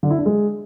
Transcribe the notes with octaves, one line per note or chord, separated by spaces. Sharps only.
D3
E4
D4
G#3